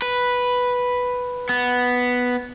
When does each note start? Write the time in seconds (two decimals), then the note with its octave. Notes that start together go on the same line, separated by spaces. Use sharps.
0.02 B4
1.49 B3